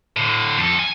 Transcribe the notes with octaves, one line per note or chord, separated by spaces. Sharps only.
A2 D3
F2 A4
G#5